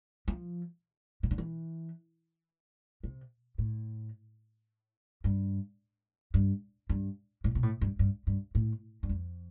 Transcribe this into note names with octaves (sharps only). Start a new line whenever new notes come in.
F3
C3
D3
E3
C3
A2
G2
G2
G2
A2
B2
A2
G2
G2
G2
A2
G2
F2